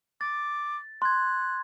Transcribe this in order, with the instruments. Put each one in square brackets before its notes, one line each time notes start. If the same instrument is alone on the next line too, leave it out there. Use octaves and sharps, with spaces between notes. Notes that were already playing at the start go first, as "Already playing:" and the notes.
[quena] D6 [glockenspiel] A6
[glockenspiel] C6 G#6 [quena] F#6